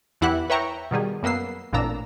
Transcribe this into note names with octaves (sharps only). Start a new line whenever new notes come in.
E2 E3 E4 G4 F#5 F#6
B4 C#5 E5 G5 A#5 C#6
B2 D#3 G3 G#4
F#2 A#3 B3 E6 C7
A1 F2 A#2 D4 A#5 E6